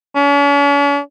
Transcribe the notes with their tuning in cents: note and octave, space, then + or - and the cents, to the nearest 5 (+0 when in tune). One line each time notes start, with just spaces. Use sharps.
C#4 +45